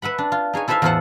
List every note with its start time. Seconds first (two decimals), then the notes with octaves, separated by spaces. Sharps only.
0.02 B4 E5 F#5 B5
0.18 D4
0.32 F4
0.53 D#4 G#4 C#5 G#5
0.68 E4 A4 B4 C5 E5 F5
0.82 E2 A2 F4 A4 C5 F#5